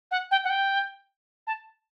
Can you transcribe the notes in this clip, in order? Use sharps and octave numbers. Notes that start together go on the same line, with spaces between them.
F#5
G5
F#5
G5
A5